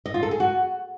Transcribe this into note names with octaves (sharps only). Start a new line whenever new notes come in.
D#5
F4
A4
G#4
F#4